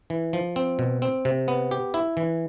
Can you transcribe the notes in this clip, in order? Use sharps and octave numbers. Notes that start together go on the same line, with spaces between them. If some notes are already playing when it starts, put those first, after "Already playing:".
E3
F3
C4
B2
C4
C3
B3
G4
E4
E3